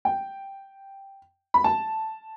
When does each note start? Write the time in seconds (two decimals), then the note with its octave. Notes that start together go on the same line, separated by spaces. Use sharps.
0.05 G5
1.54 B5
1.64 A5